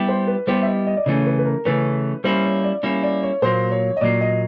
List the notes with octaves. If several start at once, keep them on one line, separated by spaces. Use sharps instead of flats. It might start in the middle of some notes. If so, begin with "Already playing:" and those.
Already playing: G3 B3 E4 G4
C5
B4
G3 B3 E4 G4 C5
E5
D#5
D#5
D5
C#3 E3 A3 C#4 C#5
B4
B4
A#4
C#3 E3 A3 C#4 B4
G3 A#3 C#4 E4 C5
C#5
D5
G3 A#3 C#4 E4
D5
C#5
A#2 F#3 A#3 C5
C#5
D#5
A#2 F#3 A#3 D5
D#5